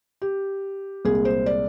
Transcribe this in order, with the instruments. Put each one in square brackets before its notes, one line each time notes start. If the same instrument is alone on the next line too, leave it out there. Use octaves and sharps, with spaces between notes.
[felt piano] G4
C2 A#2 G#3 G#4
C5
D5